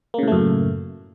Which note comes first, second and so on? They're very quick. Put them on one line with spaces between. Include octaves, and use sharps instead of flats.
A#3 C#3 A2 A3 F#2